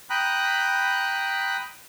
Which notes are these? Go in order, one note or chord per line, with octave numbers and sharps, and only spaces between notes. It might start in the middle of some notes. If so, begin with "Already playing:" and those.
G5 A#5 B5 D#6 F#6